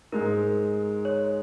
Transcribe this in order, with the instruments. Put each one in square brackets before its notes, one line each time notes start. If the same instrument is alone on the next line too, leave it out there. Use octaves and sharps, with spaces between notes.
[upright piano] G#2 G#3 D#4 [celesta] A#4
[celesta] C#5